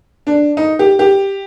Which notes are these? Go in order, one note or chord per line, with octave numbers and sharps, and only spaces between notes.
D4
D#4
G4
G4